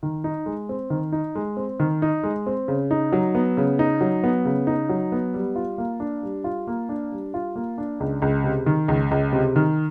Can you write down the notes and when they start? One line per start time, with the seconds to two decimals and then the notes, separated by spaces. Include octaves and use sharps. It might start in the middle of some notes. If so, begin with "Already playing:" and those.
0.03 D#3
0.24 D#4
0.46 G#3
0.69 C4
0.90 D#3
1.12 D#4
1.35 G#3
1.57 C4
1.80 D#3
2.02 D#4
2.24 G#3
2.47 C4
2.68 C#3
2.91 D#4
3.13 F#3
3.35 B3
3.57 C#3
3.79 D#4
4.01 F#3
4.24 B3
4.45 C#3
4.67 D#4
4.89 F#3
5.12 B3
5.34 G3
5.56 F4
5.78 A#3
6.00 D4
6.23 G3
6.44 F4
6.67 A#3
6.89 D4
7.12 G3
7.34 F4
7.56 A#3
7.78 D4
8.00 C#2
8.22 C#2
8.44 C3
8.66 D#3
8.88 C#2
9.11 C#2
9.33 C3
9.56 D#3